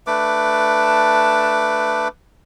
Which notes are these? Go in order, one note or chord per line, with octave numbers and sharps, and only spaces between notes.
A3 D4 B4 D6